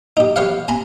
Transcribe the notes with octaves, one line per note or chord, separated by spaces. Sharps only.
D#4 G4
G4 B4 C#5 F5 F#5
G#5 A#5 B5